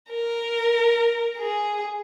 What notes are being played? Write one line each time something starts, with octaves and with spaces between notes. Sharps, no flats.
A#4
G#4